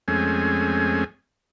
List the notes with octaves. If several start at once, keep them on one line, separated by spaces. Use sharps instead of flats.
F2 G#3 A3 C4 C#4 G#5